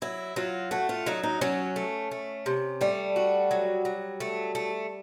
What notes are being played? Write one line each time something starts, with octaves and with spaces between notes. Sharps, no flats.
F#3 E4
F#3 F4
A3 F#4
F4
F#3 D#4
D#4
F#3 C#4
A3
A3
C3
G3 A3
F#4
F#3
F#3
A3
A3